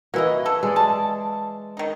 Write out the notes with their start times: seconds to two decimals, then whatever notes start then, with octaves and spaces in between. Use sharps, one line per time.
0.14 E3 A#3 E4 F#4 D#5
0.46 A4
0.63 G#3 A4 D5
0.76 A5
1.77 D#3 D#4